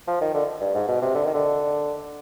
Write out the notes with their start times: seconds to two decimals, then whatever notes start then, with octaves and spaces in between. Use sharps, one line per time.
0.07 F3
0.21 D#3
0.34 D3
0.61 G2
0.74 G#2
0.88 B2
1.02 C3
1.15 D3
1.24 D#3
1.34 D3